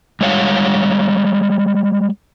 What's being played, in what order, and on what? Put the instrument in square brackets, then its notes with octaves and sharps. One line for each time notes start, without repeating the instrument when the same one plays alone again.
[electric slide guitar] G3 G#3 C#5 F5 F#5